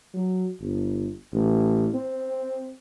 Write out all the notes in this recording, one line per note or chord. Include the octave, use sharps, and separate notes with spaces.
F#3
G1
A1
C4